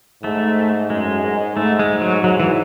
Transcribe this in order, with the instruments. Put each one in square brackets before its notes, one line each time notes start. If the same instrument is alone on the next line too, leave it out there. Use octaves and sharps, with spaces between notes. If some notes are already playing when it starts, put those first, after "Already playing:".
[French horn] G#2 [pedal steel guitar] A3
[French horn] F#2 [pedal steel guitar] G#3
[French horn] G#2
[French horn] G#2 [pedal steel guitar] A3
[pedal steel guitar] G#3
F#3
[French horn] G#2 [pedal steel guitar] F#3
[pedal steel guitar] E3